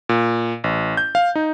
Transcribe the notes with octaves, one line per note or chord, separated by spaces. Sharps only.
A#2
A1
G6
F5
D#4